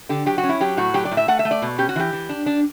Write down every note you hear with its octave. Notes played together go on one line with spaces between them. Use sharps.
D3 G4
F#3 G4
F#4
C#4
E4
F#3 G4
A2 F#4
F#3 G4
D5
A2
E5
A3 F#5
E5
A3
D5
B2
C#4 G4
F#4
E3 G4
E3
D4
D4